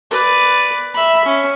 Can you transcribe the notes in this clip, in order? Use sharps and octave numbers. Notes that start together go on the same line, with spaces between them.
B4 D5
E5 B5
C#4